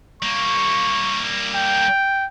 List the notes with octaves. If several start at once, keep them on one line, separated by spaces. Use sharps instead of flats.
G3 A#3 C#6
G5